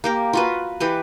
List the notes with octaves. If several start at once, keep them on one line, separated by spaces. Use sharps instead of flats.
A#3 G4 A#4
F4 F#4 B4
E3 G4 B4